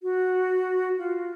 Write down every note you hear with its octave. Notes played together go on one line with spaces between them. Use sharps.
F#4
F4